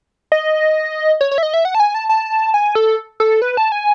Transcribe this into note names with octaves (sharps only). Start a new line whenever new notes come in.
D#5
C#5
C#5
E5
D#5
E5
F#5
A5
G#5
A5
A5
G#5
A4
A4
B4
A5
G#5